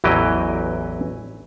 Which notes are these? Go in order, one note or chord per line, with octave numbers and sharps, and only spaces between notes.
A1 E2 E3 F#3 G4 D#5